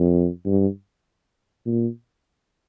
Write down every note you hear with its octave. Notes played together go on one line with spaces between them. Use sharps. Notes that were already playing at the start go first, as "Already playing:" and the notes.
Already playing: F2
G2
A#2